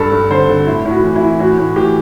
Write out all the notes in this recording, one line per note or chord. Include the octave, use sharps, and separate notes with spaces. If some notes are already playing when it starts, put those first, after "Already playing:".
Already playing: G2 A4
G2
D3 C5
D3
A2 E4
A2
F#4
E3
E4
E3
A2 F#4
A2
E3 G4